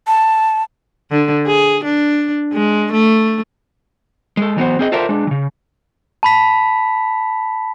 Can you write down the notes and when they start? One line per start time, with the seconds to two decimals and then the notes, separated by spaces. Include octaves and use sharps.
0.07 A5
1.11 D3
1.47 G#4
1.84 D4
2.53 G#3
2.93 A3
4.37 G#3 A4
4.56 E3 F#3 B3 C5
4.79 C4 G#4 D#5
4.92 F4 A4 A#4 C5 D5 E5
5.09 G#3 D4
5.27 C#3 E3
6.23 A5 B5 B6